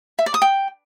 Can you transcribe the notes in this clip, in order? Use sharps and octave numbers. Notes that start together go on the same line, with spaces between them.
E5
D5
D#6
G5